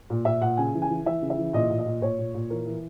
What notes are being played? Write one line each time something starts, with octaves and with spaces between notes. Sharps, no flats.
A#2
A#2 E5
A#2 F#5
C#3 G#5
E3
G#5
E3
E3 E5
C#3
E5
E3
A#2 D#5
A#2
D#5
A#2
A#2 C#5
A#2
A#2
E3 A#4
E3